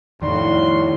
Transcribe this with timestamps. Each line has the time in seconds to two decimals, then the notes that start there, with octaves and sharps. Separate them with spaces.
0.22 F2 A2 D#3 G3 D4 F#4 F5 C6